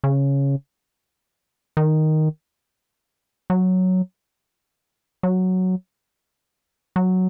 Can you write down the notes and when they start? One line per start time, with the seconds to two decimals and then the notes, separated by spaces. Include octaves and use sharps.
0.04 C#3
1.77 D#3
3.50 F#3
5.23 F#3
6.96 F#3